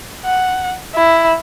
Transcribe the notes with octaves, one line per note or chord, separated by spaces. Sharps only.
F#5
E4